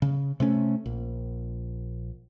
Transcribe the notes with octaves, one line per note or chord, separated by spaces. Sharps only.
C#3
C3 A3 C#4
A#1